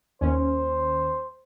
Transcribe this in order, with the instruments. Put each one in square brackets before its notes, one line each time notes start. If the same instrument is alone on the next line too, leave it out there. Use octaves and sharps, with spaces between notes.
[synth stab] D#2 C#4 [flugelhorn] C5